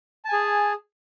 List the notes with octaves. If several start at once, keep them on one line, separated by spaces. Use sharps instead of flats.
G#4 G#5 A5